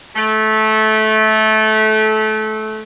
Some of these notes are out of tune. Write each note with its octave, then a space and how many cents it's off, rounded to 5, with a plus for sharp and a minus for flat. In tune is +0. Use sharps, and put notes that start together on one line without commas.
A3 -20